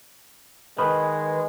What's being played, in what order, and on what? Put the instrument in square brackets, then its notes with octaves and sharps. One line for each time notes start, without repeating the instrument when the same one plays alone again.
[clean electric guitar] D#3 [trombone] G#3 [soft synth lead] B4